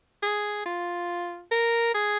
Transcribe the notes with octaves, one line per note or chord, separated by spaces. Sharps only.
G#4
F4
A#4
G#4